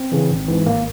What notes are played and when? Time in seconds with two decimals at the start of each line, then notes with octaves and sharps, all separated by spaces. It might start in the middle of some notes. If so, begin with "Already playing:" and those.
Already playing: C4
0.12 C#3 E3
0.30 G#1
0.48 G#2 E3
0.66 G#1 A#3